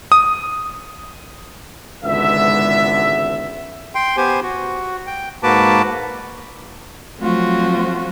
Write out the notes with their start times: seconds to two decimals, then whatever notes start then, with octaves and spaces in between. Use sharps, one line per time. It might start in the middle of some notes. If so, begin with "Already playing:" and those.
0.12 D#6
2.04 G#1 C#2 D3 B3 E5
3.95 G5 C6
4.17 B3 G4 C5 G#5
4.43 F#4
5.07 G5
5.43 G#2 A#3 F#4 B4 A5 D6
7.21 F3 F#3 A3 C4 F4 F#4